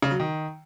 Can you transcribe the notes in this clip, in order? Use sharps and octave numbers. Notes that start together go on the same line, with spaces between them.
C#3
F#3
D#3